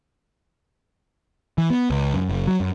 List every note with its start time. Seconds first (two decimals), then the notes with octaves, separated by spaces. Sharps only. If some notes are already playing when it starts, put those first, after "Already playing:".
1.58 E3
1.70 B3
1.90 C#2
2.14 F#2
2.29 F#1
2.47 F#3
2.60 F#2